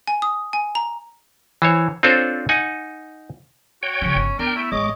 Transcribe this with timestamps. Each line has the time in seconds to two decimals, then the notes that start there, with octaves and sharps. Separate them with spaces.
0.07 G#5
0.22 D#6
0.53 G#5
0.75 A#5
1.62 E3 C5 C#5
2.03 C4 D4 F4 A4 C5 C#5
2.49 D#4 F#5 G#5
3.83 F#4 C#5 G5
4.02 C#3 F3 C#4
4.15 G1
4.39 B3 D4 A#4 G5
4.56 A3 E4
4.72 A1 G#3 C#5 D#5 D6